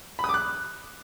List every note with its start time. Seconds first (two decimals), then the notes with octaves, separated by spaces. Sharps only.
0.19 B5
0.24 D#6
0.29 D6
0.34 F#6